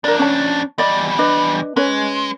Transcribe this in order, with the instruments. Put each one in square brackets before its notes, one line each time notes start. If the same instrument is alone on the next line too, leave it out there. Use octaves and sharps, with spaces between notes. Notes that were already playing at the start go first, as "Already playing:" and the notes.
[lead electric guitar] F2 D4 [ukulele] A#4 D5
[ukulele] C#4 A5
[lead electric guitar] E2 G3 [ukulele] D5 D#5
[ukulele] D4 B4 D#5
[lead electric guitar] G#3 [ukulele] C#4 B4 C#5